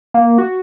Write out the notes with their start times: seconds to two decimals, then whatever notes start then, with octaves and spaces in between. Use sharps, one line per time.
0.14 A#3
0.38 F#4